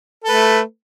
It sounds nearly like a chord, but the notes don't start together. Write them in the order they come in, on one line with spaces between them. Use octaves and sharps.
A4 B4 A3